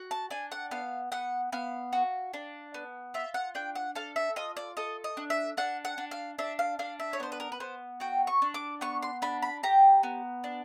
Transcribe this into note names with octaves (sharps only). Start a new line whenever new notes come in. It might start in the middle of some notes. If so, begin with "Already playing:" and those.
Already playing: F#4
A5
D4 G#5
F#5
B3 F5
B3 F#5
B3 F5
F#4
D4
B3
F4 E5
F#5
D4 G5
F#5
A4 F5
E5
F4 D#5
D5
A4 D#5
D#5
D4
E5
D4 F#5
F#5
D4
F5
D4 E5
F5
D4 F5
E5
C#5
B3 C5
B4
A#4
B4
B3 C5
F#4 G5
C#6
D4
D6
B3 C#6
C6
D4 B5
B5
G4 A#5
B3
D4